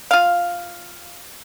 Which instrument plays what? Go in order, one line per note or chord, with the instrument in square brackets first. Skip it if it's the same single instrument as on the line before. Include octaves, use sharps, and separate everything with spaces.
[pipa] F4 F5